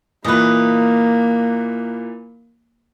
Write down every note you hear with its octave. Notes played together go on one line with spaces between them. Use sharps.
A#2 E3 A#3 B4 D#5